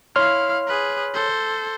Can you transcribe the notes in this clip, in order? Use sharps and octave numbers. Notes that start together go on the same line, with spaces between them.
E4 C#5 F5 C6 F6
G#4 B4
A4 C5